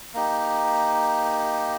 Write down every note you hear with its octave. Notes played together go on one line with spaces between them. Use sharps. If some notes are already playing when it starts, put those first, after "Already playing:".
A#3 D#4 G4